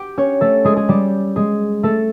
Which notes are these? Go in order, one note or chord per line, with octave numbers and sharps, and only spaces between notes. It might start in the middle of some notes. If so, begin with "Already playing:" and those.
Already playing: G4 G5
C#4 C#5
A3 A4
G#3 G#4
G#4
G3 G4
G#3 G#4
A3 A4